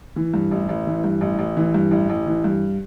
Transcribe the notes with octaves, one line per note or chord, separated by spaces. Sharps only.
E3
G2
A1
A1
E3
G2
A1
A1
E3
G2
A1
A1
E3
G2